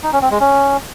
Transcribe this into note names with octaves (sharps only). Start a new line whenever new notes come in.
D#4
C#4
C4
G#3
C#4